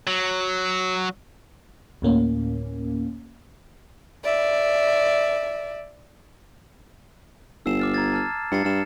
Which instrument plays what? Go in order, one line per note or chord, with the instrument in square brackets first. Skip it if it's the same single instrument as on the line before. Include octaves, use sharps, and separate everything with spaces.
[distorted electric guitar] F#3
[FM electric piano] D2 A2 A#3 C#4
[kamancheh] D5 E5
[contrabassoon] G1 [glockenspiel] E6 C7 E7
[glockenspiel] D6 F6 A6
A#5 G#6 A6
A5 F6
[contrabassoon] G2 [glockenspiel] A6 C7 C#7
[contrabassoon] G2 [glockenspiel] F6 E7